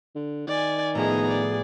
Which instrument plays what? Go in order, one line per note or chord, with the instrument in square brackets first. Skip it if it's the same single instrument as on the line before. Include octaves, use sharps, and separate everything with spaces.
[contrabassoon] D3
[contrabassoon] D#3 [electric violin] D5 G#5
[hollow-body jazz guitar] A2 F3 E4 [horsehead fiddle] B3 G#4 [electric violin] D#5 A#5
[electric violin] D5